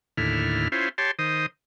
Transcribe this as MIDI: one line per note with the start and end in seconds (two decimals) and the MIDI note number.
0.17 0.68 39
0.17 0.68 45
0.17 0.68 50
0.17 0.68 64
0.17 0.68 89
0.72 0.89 61
0.72 0.89 64
0.72 0.89 65
0.72 0.89 72
0.98 1.11 67
0.98 1.11 73
0.98 1.11 81
0.98 1.11 84
1.19 1.46 51
1.19 1.46 72
1.19 1.46 87